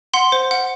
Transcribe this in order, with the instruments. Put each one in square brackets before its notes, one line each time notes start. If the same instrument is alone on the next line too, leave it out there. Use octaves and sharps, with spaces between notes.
[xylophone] F#5 C6
C5
F#5